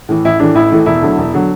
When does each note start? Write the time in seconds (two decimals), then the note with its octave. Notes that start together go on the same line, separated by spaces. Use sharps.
0.09 A2 E3
0.25 A1 E4
0.40 A2 E3 A3 D4
0.55 A1 E4
0.71 A2 E3 A3
0.86 E1 E4
1.02 D2 D3 F#3
1.18 E1
1.34 D3 F#3